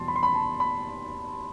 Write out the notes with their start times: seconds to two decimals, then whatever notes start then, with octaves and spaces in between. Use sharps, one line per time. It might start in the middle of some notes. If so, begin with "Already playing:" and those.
Already playing: E2 B2 G3 A5 C6
0.08 B5
0.16 C6
0.23 B5
0.35 A5
0.60 B5